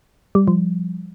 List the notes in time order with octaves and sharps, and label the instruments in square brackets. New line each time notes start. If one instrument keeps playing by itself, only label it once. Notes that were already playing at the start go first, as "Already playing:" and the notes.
[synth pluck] G3
F3